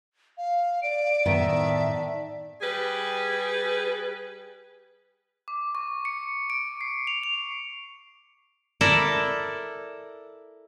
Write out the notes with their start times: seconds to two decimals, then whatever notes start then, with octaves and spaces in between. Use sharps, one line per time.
0.37 F5
0.82 D5 D7
1.26 A2 D#3 B3 E5
2.61 G3 G#4 B4
5.48 D6
5.75 C#6
6.05 C#7
6.50 D7
6.81 C7
7.07 F7
7.23 F7
8.81 E4 A4 A#4 D5